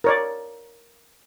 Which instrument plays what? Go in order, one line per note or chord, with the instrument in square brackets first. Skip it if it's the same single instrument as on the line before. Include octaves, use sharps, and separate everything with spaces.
[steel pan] A#4 C#5 D5